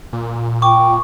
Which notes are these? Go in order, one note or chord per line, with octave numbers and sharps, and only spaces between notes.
A#2
G5 C#6 D6